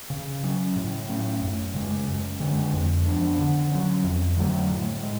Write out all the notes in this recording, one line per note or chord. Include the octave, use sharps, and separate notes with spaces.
C#3
F#3 C#4
A2
F#3 A3 C#4
F#2
C#3 G#3
F#2
D3 G#3
F2
F3 B3 D4
D3
F#3 C#4
F2
D3 F#3 A3
A2
G#3